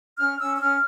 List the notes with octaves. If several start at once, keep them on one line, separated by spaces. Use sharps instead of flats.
C#4 F6
C#4 E6
E6
C#4 F6